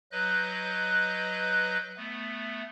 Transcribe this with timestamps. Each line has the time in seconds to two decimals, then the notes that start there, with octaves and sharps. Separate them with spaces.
0.12 F#3 B4 D#5 F#6 G6
1.97 A3 B3